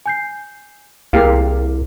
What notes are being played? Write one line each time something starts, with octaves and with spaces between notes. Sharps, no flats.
G#5 G6 C7
C2 A#3 E4 G4 G#4 F5 F6